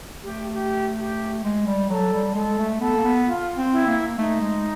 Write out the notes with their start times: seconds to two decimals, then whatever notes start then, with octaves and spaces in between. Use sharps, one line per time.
0.23 A3 G4
0.53 G4
0.99 G4
1.44 G#3
1.67 G3
1.89 F#3 A4
2.13 G3
2.35 G#3 A4
2.59 A3
2.80 B3 A4
2.97 A#3
3.04 B3
3.26 F4
3.57 C4
3.72 E4
3.87 A#3
4.18 A3 D#4
4.41 G#3